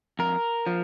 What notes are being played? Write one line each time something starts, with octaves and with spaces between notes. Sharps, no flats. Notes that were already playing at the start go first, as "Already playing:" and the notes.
F2 A#4
F3